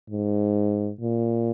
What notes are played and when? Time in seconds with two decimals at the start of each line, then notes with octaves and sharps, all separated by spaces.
0.10 G#2
1.01 A#2